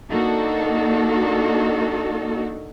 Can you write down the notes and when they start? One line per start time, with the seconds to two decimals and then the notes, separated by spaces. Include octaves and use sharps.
0.10 A#3 D4 D#4 F#4 A4